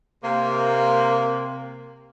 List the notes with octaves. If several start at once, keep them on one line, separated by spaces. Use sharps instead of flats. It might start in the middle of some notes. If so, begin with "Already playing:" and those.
C3 A#3